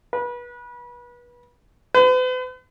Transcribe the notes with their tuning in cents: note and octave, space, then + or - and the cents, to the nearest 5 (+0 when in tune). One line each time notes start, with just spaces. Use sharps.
B4 -30
B4 +45